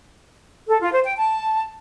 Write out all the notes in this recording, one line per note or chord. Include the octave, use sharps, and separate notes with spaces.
A4
F4
C5
G5
A5